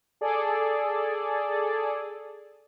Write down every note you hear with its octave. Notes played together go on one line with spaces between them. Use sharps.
G#4 A4 D5